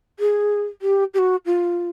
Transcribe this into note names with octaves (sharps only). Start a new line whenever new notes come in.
G#4
G4
G4
F#4
F4